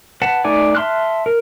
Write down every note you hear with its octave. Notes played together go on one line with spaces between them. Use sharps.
B4 F#5 A5
A3 D#4 D5 G#5
E5 A5 C6 F6 F#6
A#4